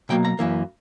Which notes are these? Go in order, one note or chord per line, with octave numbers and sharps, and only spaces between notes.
B2 F#3 A#3 G5
A#5
F#2 E3 A#3